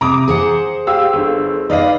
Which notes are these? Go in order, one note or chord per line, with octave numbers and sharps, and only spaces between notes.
C3 A#5 D6 D#6
G#4 C5 F#5
G4 F5 E6
G1 D3
D#4 B4 D5 D#5 F5